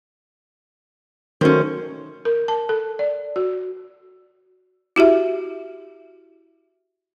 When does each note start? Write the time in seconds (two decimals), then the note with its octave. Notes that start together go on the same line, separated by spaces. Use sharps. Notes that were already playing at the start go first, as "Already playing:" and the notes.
1.41 D#3 F#3 A3 C#4 C5
2.25 A#4
2.48 A5
2.69 A4
2.99 D5
3.36 F#4
4.96 E4 F#4 G4 E5